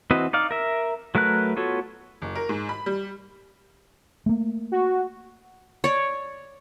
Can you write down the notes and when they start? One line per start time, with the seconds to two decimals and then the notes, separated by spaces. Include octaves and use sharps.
0.11 E3 C4 F#4 B4 D#5
0.33 D#4 D5 F5
0.51 A#4 E5
1.15 F#3 A3 A#4 B4 F#6
1.57 B3 F4 F#4 A4 C#5
2.22 F#1
2.35 A#4
2.49 G#2
2.69 B5
2.86 G3
4.26 A3 A#3
4.72 F#4
5.84 C#5 D5